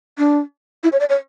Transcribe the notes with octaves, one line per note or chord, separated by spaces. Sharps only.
D4
E4
C#5
D5
C#5